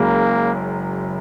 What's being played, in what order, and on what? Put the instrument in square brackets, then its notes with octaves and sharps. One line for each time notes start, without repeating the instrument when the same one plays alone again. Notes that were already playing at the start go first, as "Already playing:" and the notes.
Already playing: [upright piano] F#1 F#2 C#3 G#3 [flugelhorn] A#3